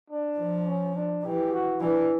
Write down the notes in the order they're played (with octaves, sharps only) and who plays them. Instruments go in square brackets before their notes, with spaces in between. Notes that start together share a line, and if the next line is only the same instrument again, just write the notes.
[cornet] D4
[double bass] F3
[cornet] C#4
D4
[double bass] E3 [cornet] G4
[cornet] F#4
[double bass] E3 [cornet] D4